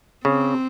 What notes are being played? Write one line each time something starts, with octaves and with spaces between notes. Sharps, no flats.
C#3 C4